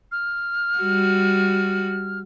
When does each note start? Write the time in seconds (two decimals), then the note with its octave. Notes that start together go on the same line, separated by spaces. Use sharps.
0.12 F6
0.79 G3 F#4